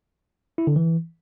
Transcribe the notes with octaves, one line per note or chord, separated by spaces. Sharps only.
E4
D3
E3